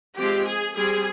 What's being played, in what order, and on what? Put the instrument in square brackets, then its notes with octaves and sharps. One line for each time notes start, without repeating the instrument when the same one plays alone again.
[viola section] F3 G#3 C4 G4
G#4
G3 C4 G#4